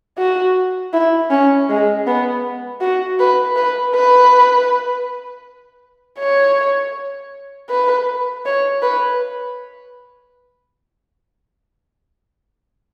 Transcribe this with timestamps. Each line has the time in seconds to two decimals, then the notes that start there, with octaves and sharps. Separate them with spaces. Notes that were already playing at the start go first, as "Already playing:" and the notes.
0.18 F#4
0.93 E4
1.30 C#4
1.69 G#3
2.07 B3
2.81 F#4
3.19 B4
3.56 B4
3.95 B4
6.19 C#5
7.70 B4
8.46 C#5
8.82 B4